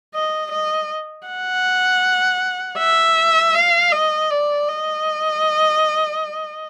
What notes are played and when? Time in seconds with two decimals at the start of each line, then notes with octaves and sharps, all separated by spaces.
0.14 D#5
0.52 D#5
1.27 F#5
2.79 E5
3.55 F5
3.92 D#5
4.30 D5
4.68 D#5